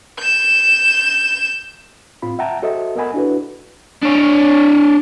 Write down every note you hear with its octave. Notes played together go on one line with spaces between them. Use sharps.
G6 E7
A2 C4 F4 B5
E5 F#5 G5 A5 A#5
F#4 A4 C5 D#5 E5
B3 A#4 D#5 F#5 G#5 B5
D4 E4 F#4 A4 B4
D4 C#5